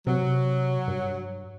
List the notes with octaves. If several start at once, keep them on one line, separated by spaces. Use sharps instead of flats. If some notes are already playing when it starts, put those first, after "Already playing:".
C3 F#3
G2